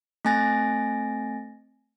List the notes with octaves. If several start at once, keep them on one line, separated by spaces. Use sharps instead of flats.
A3 C4 G#5 A6 A#6